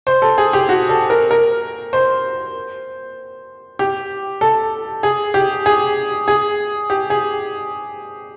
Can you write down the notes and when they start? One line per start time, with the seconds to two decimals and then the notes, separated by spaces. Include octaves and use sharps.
0.07 C5
0.22 A4
0.38 G#4
0.53 G4
0.69 F#4
0.89 A4
1.10 A#4
1.31 A#4
1.93 C5
3.79 G4
4.41 A4
5.03 G#4
5.34 G4
5.66 G#4
6.28 G#4
6.90 G4
7.10 G#4